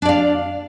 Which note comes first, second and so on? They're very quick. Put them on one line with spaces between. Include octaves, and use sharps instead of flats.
D4 D5 F5